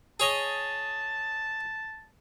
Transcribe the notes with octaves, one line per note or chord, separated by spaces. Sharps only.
G#4 C#5 D#5 A5